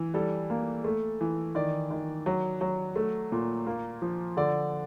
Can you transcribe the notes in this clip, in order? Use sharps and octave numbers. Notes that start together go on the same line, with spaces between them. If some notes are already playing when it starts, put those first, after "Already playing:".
Already playing: E3
G3 A4
A#3
A3
E3
D#3 D5
D#3
F#3
F#3
A3
A#2
A#3
F3
D3 D5